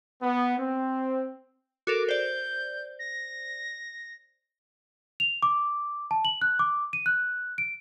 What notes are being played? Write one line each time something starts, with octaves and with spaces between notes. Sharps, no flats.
B3
C4
F#4 A4 A#4 D6
C5 D5 G6
A#6
F7
D6
A5
F#7
F#6
D6
D#7
F#6
D7